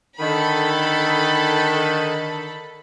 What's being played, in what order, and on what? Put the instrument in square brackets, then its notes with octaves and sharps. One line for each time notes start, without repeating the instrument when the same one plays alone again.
[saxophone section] D3 D#3 [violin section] A4 B5